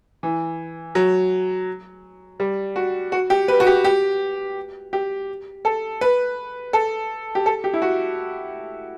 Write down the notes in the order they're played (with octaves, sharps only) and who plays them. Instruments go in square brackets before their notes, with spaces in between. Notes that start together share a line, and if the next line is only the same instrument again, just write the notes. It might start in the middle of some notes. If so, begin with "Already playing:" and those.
[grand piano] E3
F#3
G3
F#4
F#4
G4
B4
F#4
G4
G4
G4
A4
B4
A4
G4
A4
G4
E4
F#4